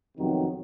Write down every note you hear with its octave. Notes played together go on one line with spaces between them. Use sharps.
F2 C3 D#3 F#3 B3